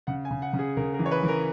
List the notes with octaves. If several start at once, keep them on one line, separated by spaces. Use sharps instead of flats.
C#3 F#5
G#5
C#3
F#5
C#3
G#4
C#3 A#4
A#4
E3
C#5
B4
E3 A#4